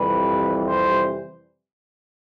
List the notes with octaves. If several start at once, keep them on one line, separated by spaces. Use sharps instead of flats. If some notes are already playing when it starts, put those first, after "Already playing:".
Already playing: F2 C3 E3 G3 B4
C5